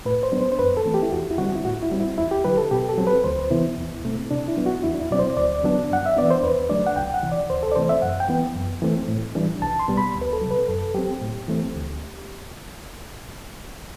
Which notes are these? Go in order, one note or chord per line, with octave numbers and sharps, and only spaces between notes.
A2 B4
C5
F#3 B3 D4
C5
C5
F#2 B4
A4
E3 A3 C4
G4
E4
E2 F#4
E4
D3 G3 C4 F#4
E4
A2 F#4
E4
G3 C4
E4
E2 E4
G4
D3 F#3 B4
A4
B2 G4
A4
F#3 C4
B4
D2 C5
C3 E3 B3 E4
E2
B2 A3 C4
C3 D4
E4
F#3 B3 D4
F#4
E2 E4
D4
E4
B2 F#3 C4 D5
C5
D2 D5
D3 F#3 B3 D4
G2 F#5
E5
E3 B3 D4 D5
C5
E2 B4
D3 F#3 A3 D4 D5
F#5
C2 G5
F#5
C3 E3
D5
D2 C5
A4
D5
C3 E3 A3 C4 C5
E5
F#2 F#5
G5
E3 B3
F#2
E3 A3 C4
A2
E3 G3 D4
C2 A5
C6
B2 G3 B3
B5
D2
B4
A4
C3 F#3
B4
F#2 A4
F#3 C4 G4
A2
E3 A3 C4
D2